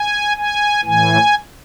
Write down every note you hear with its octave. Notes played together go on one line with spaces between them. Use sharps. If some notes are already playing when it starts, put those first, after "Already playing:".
Already playing: G#5
G#5
A2 E3 G#5